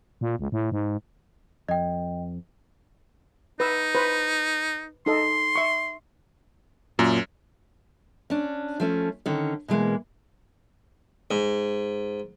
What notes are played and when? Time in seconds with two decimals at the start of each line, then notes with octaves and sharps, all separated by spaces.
0.21 A#2
0.39 C#2
0.52 A2
0.72 G#2
1.69 F2 D#5 G5
3.60 D#4 B4 E6
3.95 B4 C5
5.06 D#4 A4 D#5 C6
5.56 E5 C#6
6.99 F#2 A#2
8.30 C#4 D4
8.80 F3 A3 C#4
9.26 D3 D#3 C#4
9.68 B2 E3 G#3 A#3
11.31 G#2